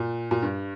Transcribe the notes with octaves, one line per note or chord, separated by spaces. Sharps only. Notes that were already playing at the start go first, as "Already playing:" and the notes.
Already playing: A#2
A#2
G2